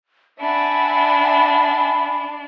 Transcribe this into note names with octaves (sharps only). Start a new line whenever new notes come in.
D4 E5 F#5 G#5 B5